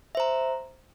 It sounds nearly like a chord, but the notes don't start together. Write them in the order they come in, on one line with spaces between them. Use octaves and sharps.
E5 C5 A#5